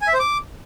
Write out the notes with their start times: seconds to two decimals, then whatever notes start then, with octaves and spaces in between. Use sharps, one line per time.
0.02 G#5
0.08 E5
0.14 C5
0.19 D6